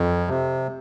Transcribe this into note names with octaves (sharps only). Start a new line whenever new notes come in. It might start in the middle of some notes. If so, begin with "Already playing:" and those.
Already playing: F2
C3